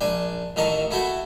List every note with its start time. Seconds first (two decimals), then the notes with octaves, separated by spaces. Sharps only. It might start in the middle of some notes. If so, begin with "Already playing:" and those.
0.01 A#1 D4 G#5
0.56 A1 D#3 A4 A#4 D#5 C#6
0.91 A3 E4 F#4 A4 G5